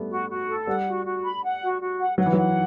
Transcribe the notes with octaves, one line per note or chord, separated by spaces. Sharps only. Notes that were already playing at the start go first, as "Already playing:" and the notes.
Already playing: G3 A3 B3
F#4
F#4
A4
G3 F#5
F#4
F#4
B5
F#5
F#4
F#4
F#5
F#3 F#5
E3
F#3 F#5